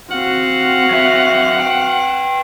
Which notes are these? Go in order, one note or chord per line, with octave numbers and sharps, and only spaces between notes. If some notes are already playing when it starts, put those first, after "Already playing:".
C4 F#4 F5 F#5
F#3 E5
B4 G5